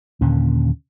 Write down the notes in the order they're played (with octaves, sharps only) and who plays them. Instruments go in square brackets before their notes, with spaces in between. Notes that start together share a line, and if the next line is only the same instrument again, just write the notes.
[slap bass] D#2 A#2 D3 C#4